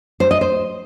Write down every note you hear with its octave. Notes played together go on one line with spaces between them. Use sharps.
C5
D#5
C5